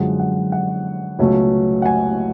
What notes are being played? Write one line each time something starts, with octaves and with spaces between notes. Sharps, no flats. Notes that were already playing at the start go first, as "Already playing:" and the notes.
Already playing: F#2 D3 F3 G#3 F#5
F#5
F#5
C#2 B2 F#3 A3 C#4
F#5
G#5